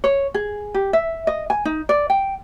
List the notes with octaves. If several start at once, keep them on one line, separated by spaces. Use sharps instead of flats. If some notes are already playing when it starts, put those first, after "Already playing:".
C#5
G#4
G4
E5
D#5
G#5
D#4
D5
G5